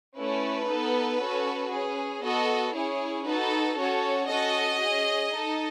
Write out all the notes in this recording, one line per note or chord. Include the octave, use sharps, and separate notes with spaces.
A3 C#4 E4 B4
B3 D#4 A4
C#4 F#4 A4
C#4 G#4
B3 F#4 A4 D#5
C#4 E4 G#4 C#5
D#4 F#4 A4 B4
C#4 F#4 A4 C#5
C#4 F#4 A4 D#5
C#4 G#4
D#4 A4